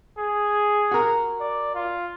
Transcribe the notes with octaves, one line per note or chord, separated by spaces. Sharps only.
G#4
F#4 A#4
D5
F4